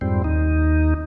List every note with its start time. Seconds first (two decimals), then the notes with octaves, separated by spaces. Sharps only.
0.01 F2 G#2 G3 C4
0.24 D#2 D#4